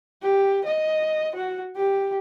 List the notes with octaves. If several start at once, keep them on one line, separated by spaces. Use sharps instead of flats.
G4
D#5
F#4
G4